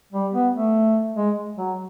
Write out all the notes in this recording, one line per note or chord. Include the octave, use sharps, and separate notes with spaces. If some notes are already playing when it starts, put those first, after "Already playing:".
G3
B3
A3
G#3
F#3